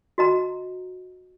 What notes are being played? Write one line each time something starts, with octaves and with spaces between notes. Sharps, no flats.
F#4 D#5 A#5